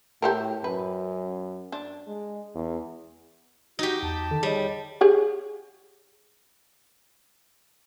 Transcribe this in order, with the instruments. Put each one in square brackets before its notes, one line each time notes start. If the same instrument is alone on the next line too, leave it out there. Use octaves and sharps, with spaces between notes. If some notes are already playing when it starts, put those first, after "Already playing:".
[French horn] A2 [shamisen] G4 A4 A#4
[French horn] F#2 [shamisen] B4
[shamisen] D4
[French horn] G#3
E2
[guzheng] D#4 G4 [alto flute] F#4
[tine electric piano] E2 [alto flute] A5
[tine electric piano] D3 D#3 A4
[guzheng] G3 [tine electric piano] G#4 C#5 D#5
[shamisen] G4 G#4 C#5